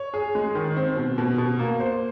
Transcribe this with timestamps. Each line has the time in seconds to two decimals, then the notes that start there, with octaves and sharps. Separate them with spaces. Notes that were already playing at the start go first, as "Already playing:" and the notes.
Already playing: C#5
0.14 G#4
0.35 G#3
0.55 D#3
0.77 C4
0.97 B2
1.18 B2
1.38 B2
1.59 A#3
1.80 C5